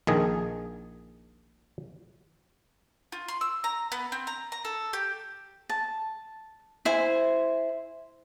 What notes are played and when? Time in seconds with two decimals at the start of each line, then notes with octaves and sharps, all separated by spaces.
0.07 A#1 D#3 G#4
3.12 F4
3.28 C6
3.41 E6
3.64 A#5
3.92 B3
4.12 C4
4.27 A#5
4.52 A#5
4.65 A4
4.93 G4
5.69 A5
6.85 E4 C5 G#5